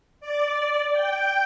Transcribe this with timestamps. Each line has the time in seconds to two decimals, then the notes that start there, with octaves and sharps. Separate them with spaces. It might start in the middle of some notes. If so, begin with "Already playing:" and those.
0.20 D5
0.92 G5